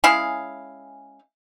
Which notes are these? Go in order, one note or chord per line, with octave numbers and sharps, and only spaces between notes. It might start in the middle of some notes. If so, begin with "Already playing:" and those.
G#3 C#4 E4 F5